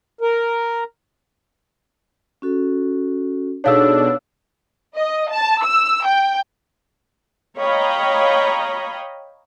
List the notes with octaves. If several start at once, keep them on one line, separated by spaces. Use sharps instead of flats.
A#4
C#4 F#4 A4
B2 D4 D#4 G#4 A4 C#5 F5 E6
D#5
A5
E6
G5
C#5 D#5 F5 G5 A#5 B5